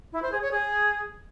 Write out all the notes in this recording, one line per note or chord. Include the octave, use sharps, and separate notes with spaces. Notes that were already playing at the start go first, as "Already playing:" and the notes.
E4
C5
G#4
C#5
G#4